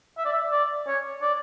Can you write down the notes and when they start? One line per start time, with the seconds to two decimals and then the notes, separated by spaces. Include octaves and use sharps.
0.18 E5
0.25 D5
0.33 E5
0.52 D5
0.87 C#5
1.21 D5